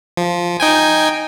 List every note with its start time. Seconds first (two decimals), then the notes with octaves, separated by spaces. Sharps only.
0.17 F3
0.60 D#4 G5 G#5